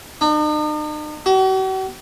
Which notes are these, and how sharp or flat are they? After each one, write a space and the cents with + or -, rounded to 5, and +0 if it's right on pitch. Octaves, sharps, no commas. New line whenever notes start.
D#4 -45
F#4 +45